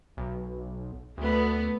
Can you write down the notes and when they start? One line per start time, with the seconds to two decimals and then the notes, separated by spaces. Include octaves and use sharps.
0.17 B1
1.18 D2 A3 B3